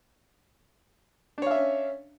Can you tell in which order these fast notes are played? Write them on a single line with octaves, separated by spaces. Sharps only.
D4 C#5 F5 E5 C#4